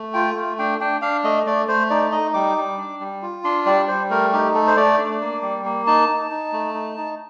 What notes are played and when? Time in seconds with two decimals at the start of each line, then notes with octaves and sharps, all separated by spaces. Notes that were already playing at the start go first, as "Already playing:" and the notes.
Already playing: A3
0.14 F4 G5
0.36 A3
0.59 D4 G5
0.81 D4 G5
1.02 D4 F5
1.24 A3 D#5
1.46 A3 D5
1.68 A3 C5
1.90 D#4 D5
2.12 D#4 D#5
2.34 G3 D6
2.57 G3
2.78 D4
3.00 G3
3.22 F4
3.44 D4 C6
3.66 G3 D5
3.88 G3 C5
4.11 A3 A#4
4.33 D#4 G4
4.54 A3 A4
4.68 C5
4.77 A3 D5
4.98 D4
5.21 A#3
5.42 G3
5.65 A#3
5.87 D#4 A5
6.09 D#4
6.31 D#4
6.53 A3
6.74 D#4
6.97 D#4